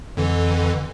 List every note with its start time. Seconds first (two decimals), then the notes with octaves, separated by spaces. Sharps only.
0.17 F2 D3 E3